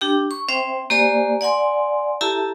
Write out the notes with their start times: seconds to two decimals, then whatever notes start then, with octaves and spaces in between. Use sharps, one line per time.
0.01 D4 G4 G5
0.31 C#6
0.49 C4 C5 E5 G5
0.90 A#3 G4 C5 D5 G#5 A#5
1.41 D5 F#5 G#5 C6
2.21 E4 G4 A4 E5 A5 A#5